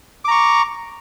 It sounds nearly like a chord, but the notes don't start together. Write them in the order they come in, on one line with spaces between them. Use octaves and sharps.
D6 A#5 C#6